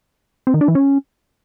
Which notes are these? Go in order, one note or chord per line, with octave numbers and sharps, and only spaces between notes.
C4
D#3
D4
E3
C#4